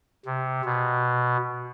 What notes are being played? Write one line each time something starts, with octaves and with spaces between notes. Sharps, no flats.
C3
B2